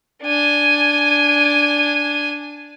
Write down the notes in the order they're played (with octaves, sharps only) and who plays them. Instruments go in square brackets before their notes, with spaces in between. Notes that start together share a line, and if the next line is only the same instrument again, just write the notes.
[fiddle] D4 G#5